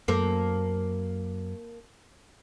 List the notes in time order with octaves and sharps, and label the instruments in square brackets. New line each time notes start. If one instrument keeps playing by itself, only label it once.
[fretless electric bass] F#2 [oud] A#3 C4 A4